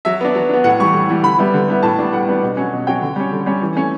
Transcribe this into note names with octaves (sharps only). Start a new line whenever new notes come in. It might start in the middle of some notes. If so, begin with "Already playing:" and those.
F#3 E5
B3 D4
F#3
B3 D4
A2 F#5
E3 G3 C#6
A2
E3 G3
D3 B5
G3 B3 E4
D3
G3 B3 E4
A2 A5
G3 B3 D4
A2 F#5
G3 B3 D4
B2
F#3 C#4
B2
F#3 C#4 G5
D3
G3 C#4
D3
G3 C#4
E3
A3 C#4